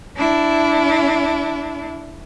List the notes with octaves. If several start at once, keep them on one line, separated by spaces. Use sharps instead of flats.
D4 E4